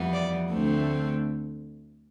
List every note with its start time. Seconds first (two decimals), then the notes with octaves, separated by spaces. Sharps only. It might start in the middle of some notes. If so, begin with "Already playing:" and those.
Already playing: F2 E3 G3 B3
0.13 D5
0.50 D2 D3 A3 C4